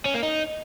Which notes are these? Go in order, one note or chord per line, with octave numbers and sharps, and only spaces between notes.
C#4
A#3
D#4